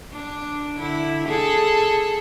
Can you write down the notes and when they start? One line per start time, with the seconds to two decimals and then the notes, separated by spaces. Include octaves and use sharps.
0.11 D4
0.77 D3 E4
1.28 G#4 A4